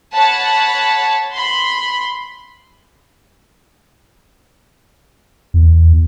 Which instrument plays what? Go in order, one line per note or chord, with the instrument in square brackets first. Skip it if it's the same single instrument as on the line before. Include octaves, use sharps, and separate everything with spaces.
[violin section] C#5 F#5 A5 B5
B5 C6
[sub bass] E2